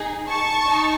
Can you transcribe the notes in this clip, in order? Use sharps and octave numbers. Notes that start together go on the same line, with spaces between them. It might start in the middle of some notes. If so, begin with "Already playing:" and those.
Already playing: D#4 G#4
A5 C#6
D#4